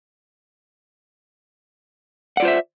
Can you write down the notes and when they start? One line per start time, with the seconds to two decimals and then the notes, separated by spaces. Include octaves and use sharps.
2.37 F#5
2.40 D5
2.42 F4
2.45 C5
2.48 E5